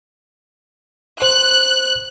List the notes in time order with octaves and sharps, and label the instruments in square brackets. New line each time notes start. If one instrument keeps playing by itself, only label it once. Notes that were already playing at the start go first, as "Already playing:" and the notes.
[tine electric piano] C5 [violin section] F#6